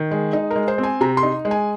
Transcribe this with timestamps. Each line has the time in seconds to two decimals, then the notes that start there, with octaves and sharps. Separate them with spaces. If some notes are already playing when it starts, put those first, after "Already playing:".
Already playing: D#3
0.11 G#3
0.33 D#4
0.51 A#4
0.56 G#3
0.68 C5
0.78 C4
0.83 G#5
1.01 C3 A#5
1.17 C6
1.23 D#4
1.45 G#3
1.51 G#5